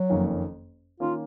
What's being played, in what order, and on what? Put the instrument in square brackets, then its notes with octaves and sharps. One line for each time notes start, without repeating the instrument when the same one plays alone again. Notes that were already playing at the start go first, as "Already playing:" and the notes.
Already playing: [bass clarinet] F#3
[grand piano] F#1 F2 D#3 A#3 C#4
[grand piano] D#3 A#3 C#4 [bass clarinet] F4